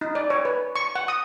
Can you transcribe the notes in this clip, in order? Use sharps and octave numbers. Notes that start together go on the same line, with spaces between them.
D#4
D5
C#5
B4
C#6
F#5
D#6